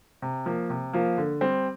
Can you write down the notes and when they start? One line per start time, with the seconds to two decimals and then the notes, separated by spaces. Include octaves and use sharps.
0.22 C3
0.46 F3 A#3
0.70 C3
0.93 F3 A#3
1.18 D3
1.41 G3 C4